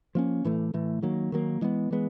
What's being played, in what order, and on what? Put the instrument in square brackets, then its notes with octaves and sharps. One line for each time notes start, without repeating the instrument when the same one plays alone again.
[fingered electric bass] F3 A#3 C#4
A2 E3 A3
A2 E3 A3
D#3 F#3 A#3
D#3 F#3 A#3
E3 G#3 B3
E3 G#3 B3